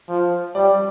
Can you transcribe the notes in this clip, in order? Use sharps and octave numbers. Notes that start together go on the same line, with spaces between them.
F3
G3 D5